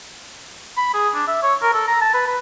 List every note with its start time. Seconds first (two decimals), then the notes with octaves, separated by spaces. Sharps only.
0.77 B5
0.94 G#4
1.14 D4
1.28 E5
1.43 C#5
1.62 A#4
1.74 A4
1.87 A#5
2.01 A5
2.14 B4
2.27 B4